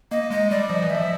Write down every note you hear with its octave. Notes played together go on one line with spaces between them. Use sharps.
A#3 D#5
G#3 D#5
G3 D5
F3 D#5
E3
F3 E5